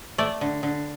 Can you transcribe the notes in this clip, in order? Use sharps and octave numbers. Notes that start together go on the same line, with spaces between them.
A3 D5
D3
D3